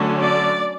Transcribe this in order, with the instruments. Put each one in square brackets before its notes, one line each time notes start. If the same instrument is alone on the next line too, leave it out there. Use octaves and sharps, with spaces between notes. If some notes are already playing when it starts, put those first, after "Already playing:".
Already playing: [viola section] D3 F#3 A3 C#4
D5